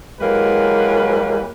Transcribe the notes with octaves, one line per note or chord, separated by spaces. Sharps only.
E3 F#3 G#3 A#3 G4 B4